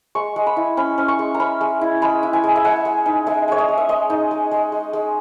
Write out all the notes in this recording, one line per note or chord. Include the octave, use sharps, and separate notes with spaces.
G#3 C#6
G#3
B5
E4
C#4 B5
C#4
C#6
G#3
A#5
C#4 B5
G#3
E4
G#3 B5
E4
G#5
G#3
E5
G#3 F#5
G#3
D#4
G#3 E5
G#3 C#5
D#5
G#3
E5
G#3 D#5
D#4
G#3
G#3
G#3
G#3